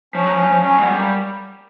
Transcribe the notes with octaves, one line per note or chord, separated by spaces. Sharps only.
F3 C#4
F#3
F3
F#3
F3
F#3 C#4
G#3 B3
G3
A#3